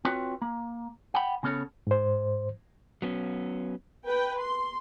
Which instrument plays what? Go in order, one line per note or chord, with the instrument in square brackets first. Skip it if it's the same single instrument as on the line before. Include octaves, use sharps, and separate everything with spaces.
[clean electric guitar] C4 F4 F#4 B4 C#5
A#3
F#5 G5 B5
C#3 B3 C#4 A4 C#5
[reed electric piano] G#2 C5
[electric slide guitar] F#3 B3 C#4
[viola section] B4 G5
C6